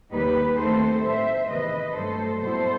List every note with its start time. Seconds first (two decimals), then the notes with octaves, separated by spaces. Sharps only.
0.11 D#2 D#3 G3 D#4 G4 B4
0.57 D#2 D#3 A3 C4 A4 C5
1.03 A2 G3 C4 C5 E5
1.49 E2 C3 D#3 B4 D#5
1.95 G2 F#3 A3 A4 C5
2.41 B2 G3 B3 E4 A4 C5